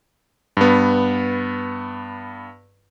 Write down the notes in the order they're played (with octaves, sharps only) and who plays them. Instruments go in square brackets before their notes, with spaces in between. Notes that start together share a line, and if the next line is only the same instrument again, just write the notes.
[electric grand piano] G2 B3